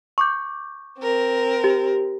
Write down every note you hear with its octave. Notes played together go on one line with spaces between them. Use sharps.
C#6 D6 G6
C4 A#4
G4